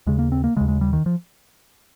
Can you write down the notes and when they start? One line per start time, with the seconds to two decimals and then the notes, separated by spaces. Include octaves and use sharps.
0.07 D#2 C#3 G#3
0.19 A#3
0.32 C4
0.44 A#3
0.56 C#3 G#3
0.61 D#2
0.68 G#3
0.81 G3
0.93 D#3
1.06 F3